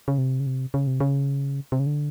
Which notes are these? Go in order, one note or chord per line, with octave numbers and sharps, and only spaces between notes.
C#3
C3
C#3
C3
C#3
C3
C#3
C3
C#3
D3